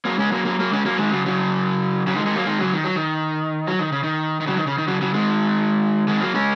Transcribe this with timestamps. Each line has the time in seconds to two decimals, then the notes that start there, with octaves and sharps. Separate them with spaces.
0.05 F#3 A#3
0.19 G#3 C#4
0.32 F#3 A#3
0.45 F#3 A#3
0.59 F#3 A#3
0.73 G#3 C#4
0.85 F#3 A#3
0.99 D#3 G#3
1.12 C#3 F#3
1.26 C#3 F#3
2.07 C#3 F#3
2.16 D#3 G#3
2.26 D#3 G#3
2.36 F#3 A#3
2.47 D#3 G#3
2.60 C#3 F#3
2.73 D#3
2.84 F#3
2.96 D#3
3.67 F#3
3.79 D#3
3.92 C#3
4.03 D#3
4.41 D#3
4.47 C#3 F#3
4.57 D#3
4.67 C#3
4.78 D#3
4.88 C#3 F#3
5.01 C#3 F#3
5.14 D#3 G#3
6.07 D#3 G#3
6.21 F#3 A#3
6.34 G#3 C#4